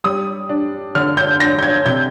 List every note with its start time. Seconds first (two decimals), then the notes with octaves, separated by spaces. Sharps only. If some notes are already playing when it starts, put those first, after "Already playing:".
0.04 G3 D#6
0.49 D4
0.95 D3 F6
1.17 G6
1.40 D4 A#6
1.59 G6
1.63 G#6
1.86 C3 G6